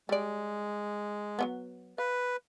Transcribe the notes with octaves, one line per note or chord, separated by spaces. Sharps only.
G3 G#3 D5
F#3 A3 B3
B4 F5